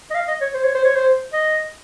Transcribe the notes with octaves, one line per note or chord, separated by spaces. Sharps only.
D#5
F5
D#5
C#5
C5
C#5
C5
C#5
C5
D#5